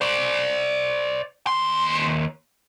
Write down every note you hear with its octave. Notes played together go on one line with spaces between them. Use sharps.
C5 D5
D#2 C6